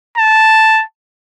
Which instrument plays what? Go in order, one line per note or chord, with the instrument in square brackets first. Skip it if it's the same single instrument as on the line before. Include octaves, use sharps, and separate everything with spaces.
[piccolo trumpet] A5